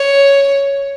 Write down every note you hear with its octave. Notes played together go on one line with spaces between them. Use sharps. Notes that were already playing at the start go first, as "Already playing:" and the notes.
Already playing: C#5